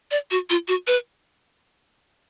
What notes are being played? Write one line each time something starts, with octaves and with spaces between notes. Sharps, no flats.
D5
F#4
F4
F#4
B4